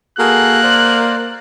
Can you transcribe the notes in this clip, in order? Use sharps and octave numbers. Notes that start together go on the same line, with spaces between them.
A#3 F#4 G#4 A4 F#6
C5 D5